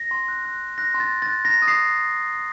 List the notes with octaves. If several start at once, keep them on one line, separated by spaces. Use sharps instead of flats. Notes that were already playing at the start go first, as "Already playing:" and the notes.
Already playing: A#6
C6
F#6
F#6
F#6
F#6 A#6
C6
A6
F#6
A6
F#6
A#5 A#6
D#6
C7